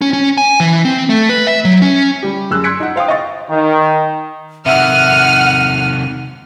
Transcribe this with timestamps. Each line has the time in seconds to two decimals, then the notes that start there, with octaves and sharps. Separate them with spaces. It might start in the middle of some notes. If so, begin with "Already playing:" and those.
0.01 C#4
0.13 C#4
0.38 G#5
0.60 E3
0.85 C4
1.09 A3
1.30 B4
1.47 E5
1.65 F#3
1.82 C#4
2.23 G3 G4
2.51 F#2 G#4 E6 F#6
2.64 C6 F#6 G#6 B6 C#7 D7
2.80 D#4 F#5
2.96 C5 F5 G5 D#6
3.08 D#5 F5 C#6 A6
3.51 D#3
4.66 C3 D#3 E5 F#5 E6 F6 D#7